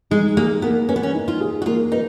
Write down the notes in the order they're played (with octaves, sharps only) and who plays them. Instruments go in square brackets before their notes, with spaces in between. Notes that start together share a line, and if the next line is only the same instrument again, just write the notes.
[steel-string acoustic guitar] G#3 [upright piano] D#4
[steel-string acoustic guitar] A#3 [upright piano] G#4
[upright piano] A#3 [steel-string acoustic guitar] B3
[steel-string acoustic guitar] C#4 [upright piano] B4
[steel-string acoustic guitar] B3
C#4
[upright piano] D#4
[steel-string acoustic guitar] F4
[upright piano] G#4
[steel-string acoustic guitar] F#4
[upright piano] A#3 [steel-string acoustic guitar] F4
[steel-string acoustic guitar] D#4 [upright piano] B4